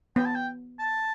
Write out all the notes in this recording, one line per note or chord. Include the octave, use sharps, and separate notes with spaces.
B3 G5
A5
G5
A5